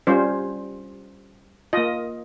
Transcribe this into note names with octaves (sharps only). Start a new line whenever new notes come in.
G3 C#4 F4 C5
A#3 F4 D#5